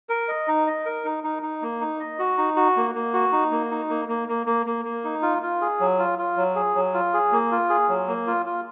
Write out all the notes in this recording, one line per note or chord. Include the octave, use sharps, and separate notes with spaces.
A#4
D#5
D#4
D#5
A#4
D#4
D#4
D#4
A#3
D#4
D#5
F#4
D#4
F#4
A#3
A#3
F#4
D#4
A#3
D#4
A#3
A#3
A#3
A#3
A#3
A#3
D#4
F4
F4
G#4
F#3
F4
F4
F#3
G#4
F#3
F4
G#4
A#3
F4
G#4
F#3
A#3
F4
F4